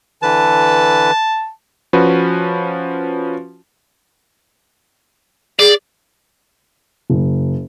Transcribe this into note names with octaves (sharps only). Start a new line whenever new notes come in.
D3 E3 B4 A5
F3 C#4 F#4 B4
G#4 D5
F#1